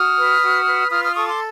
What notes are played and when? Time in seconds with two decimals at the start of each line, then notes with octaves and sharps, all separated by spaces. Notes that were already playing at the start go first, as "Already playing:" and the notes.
Already playing: F#4 D#6 F6
0.17 B4
0.41 F#4
0.66 B4
0.91 F4 D#6 F6
1.03 D#6 F6
1.14 A4 C#6 D#6
1.27 C6 D6